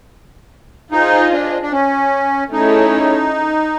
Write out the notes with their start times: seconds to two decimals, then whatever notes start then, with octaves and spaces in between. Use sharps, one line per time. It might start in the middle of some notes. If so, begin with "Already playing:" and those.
0.92 D#4 F4 G#4 C5 D#5
1.32 D4
1.62 D4
1.72 C#4
2.52 A3 C#4 D#4 E4 G#4 C#5